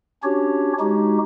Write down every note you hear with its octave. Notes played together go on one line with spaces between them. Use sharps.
C#4 D4 F#4 G4 C#5
G#3 D#4 F#4 G4